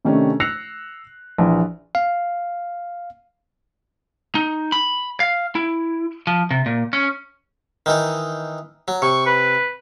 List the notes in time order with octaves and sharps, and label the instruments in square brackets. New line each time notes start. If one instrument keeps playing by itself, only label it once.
[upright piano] C3 D#3 A3 C#4 D4
E6 F#6 A#6 C7 C#7 F7
A#1 E3
[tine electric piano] F5
[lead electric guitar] D#4
B5
F5
E4
F3
C3
A#2
C#4
[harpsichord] D#3 E3 D#4
F#3
[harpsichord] C3 [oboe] C#6
[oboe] B4